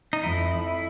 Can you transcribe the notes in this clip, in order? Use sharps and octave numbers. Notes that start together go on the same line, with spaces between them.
D#4
F2 E4